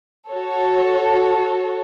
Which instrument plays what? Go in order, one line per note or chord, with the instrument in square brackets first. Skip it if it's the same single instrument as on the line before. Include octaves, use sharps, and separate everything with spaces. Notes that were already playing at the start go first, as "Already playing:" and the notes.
[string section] F#4 A4 C#5